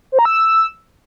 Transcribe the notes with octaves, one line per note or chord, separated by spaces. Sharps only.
C5
A#5
E6